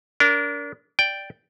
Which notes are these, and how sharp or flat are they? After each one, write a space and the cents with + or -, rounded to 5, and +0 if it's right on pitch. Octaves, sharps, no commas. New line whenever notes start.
D4 -30 A#4 +0
D5 +0 G5 +0